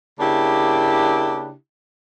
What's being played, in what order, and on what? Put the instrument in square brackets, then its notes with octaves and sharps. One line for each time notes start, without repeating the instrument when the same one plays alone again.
[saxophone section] C#3 A#3 D4 E4 G4